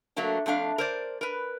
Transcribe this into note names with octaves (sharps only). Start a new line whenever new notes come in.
F#3 A3 A#3 D4
F2 A3 D4 F5
A#4 C5 D5
A#4 B4